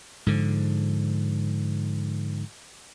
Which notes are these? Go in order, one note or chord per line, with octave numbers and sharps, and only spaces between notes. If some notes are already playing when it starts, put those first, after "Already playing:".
G#2 D3 F3